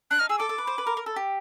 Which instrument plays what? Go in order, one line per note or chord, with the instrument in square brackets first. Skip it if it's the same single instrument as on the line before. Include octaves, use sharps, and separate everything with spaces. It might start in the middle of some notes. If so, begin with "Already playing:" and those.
[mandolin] D4 [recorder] F#6
[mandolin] D#4 [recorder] F6
[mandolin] G#4 [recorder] E6
[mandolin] A4 [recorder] D6
[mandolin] A4
B4
C5
B4
A#4
A#4
A4
G4